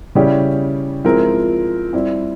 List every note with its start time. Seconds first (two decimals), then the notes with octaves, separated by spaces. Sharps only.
0.15 C#3 G3 C#4 E4 G4
1.05 F3 G#3 C4 E4 A#4
1.93 G3 C4 E4